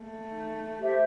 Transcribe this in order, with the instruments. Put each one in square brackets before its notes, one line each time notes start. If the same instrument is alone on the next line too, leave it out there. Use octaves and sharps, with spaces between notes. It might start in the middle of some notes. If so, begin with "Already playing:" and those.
Already playing: [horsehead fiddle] A3
[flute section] D#4
G4 C5 E5